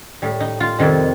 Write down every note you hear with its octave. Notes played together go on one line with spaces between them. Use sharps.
A2 G3
D#4
F4
F2 C3 D#3 G3 D#4